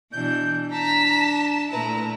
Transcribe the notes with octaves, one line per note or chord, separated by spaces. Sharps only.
B2 E3 D4 G6
D4 A5 A#5 B6
A#2 A3 E4 B4 A#5